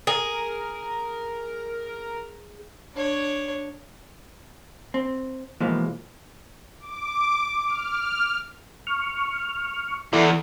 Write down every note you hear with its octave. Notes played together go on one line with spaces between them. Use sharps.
G#4 A#4
D4 C#5
C4
B2 E3 F3 G#3 A#3
D6
F6
C#6 F6
E2 E4 A4 D5